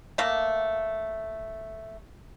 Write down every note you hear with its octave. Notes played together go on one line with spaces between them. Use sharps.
A3 A#3